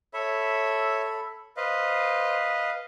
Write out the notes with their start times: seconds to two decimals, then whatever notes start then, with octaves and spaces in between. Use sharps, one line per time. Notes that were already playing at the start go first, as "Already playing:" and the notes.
0.14 A4 C#5 E5 B5
1.57 B4 C5 D#5 F5